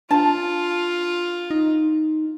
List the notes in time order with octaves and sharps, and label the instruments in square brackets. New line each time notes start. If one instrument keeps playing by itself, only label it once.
[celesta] D4 [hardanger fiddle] F4 [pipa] A5
[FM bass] D#4